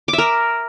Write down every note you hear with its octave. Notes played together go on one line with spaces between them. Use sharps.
D6
E5
A#4